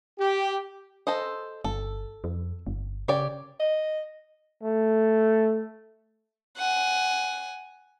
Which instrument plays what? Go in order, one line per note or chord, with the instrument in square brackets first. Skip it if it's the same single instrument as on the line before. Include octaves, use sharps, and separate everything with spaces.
[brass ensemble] G4
[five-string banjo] A4 C5 D#5
[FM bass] G1 [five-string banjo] A4
[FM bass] F2
G1
[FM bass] C#3 [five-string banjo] G4 C#5 D5
[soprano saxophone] D#5
[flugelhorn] A3
[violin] F#5 G#5